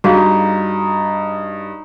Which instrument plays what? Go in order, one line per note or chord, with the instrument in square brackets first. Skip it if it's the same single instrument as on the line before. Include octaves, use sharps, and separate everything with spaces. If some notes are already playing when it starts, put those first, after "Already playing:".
[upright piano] G2 [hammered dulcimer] D#4 [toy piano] F#4 G#4 F5